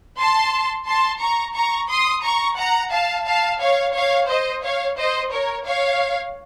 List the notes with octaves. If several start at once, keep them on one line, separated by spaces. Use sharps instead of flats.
A5 C6
A5 C6
A#5 C#6
A#5 C#6
C6 D#6
A#5 C#6
F#5 A#5
F5 A5
F5 A5
C#5 F5
C#5 F5
C5 D#5
C#5 F5
C5 D#5
A#4 C#5
C#5 F5